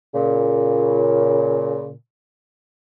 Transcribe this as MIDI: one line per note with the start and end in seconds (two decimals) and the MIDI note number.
0.14 1.91 46
0.14 1.91 49